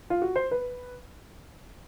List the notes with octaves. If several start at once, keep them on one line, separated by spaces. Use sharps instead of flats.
F4
F#4
C5
B4